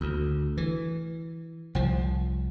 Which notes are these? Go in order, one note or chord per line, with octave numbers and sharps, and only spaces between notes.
D2
E3
C2 F3